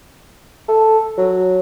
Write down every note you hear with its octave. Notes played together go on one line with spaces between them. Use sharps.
A4
F#3